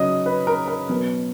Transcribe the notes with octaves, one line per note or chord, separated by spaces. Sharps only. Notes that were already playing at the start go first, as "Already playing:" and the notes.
Already playing: C#3 F#3 C#4 D#5
B4
A#4
A#4
B2 F#3 B3